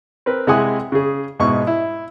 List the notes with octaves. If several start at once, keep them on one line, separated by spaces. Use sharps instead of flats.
C4 A#4 B4
C3 G#3 E4 F#5 G#5 D#6
C#3 G#4
G#2 B2 E4 C#6
E4